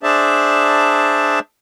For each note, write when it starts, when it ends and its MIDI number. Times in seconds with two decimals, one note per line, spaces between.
0.03 1.39 62
0.03 1.39 68
0.03 1.39 72
0.03 1.39 74
0.03 1.39 76
0.03 1.39 81